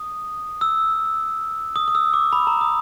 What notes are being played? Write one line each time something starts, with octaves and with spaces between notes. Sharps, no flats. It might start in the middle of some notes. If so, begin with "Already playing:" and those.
Already playing: D#6
E6
D#6
D#6
E6
D6
B5
A#5
D#6